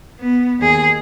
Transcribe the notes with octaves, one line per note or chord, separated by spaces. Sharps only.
B3
D#2 G#4